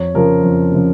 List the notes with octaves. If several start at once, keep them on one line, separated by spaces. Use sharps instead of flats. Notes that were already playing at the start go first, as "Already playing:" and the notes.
Already playing: F2 C#5
C#3 F3 A#4
F2
C#3 F3